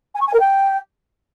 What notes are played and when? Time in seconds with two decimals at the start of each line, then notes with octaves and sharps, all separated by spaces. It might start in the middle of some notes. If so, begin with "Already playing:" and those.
0.14 G#5
0.21 C#6
0.27 G#5
0.33 A#4
0.40 G5